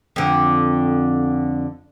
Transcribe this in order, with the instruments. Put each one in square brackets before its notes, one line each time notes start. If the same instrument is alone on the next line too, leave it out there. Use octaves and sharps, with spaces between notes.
[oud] F2 D3